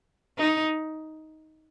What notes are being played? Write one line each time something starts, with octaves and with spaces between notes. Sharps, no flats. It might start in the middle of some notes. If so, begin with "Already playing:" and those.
D#4